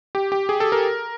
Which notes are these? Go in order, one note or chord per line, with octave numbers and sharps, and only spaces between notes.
G4
G4
G#4
A4
A#4